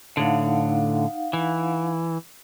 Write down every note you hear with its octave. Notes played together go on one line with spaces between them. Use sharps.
A2 D3 D#4 F5 F#5
E3